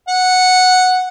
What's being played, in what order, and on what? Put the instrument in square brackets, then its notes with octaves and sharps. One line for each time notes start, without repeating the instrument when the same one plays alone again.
[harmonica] F#5